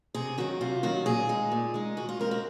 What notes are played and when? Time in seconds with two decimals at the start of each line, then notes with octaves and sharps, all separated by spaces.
0.14 C3 G#4
0.38 D#3 F#3 F#4
0.61 C3 F4
0.83 D#3 F#3 F#4
1.06 A#2 G#4
1.29 G#3 D#4
1.52 A#2
1.74 G#3 D#4
1.97 D#3 F#4
2.09 F4
2.19 G#3 C4 A#4
2.31 F#4